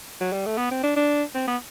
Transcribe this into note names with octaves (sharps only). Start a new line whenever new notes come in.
F#3
G3
A3
B3
C4
D4
D4
C4
B3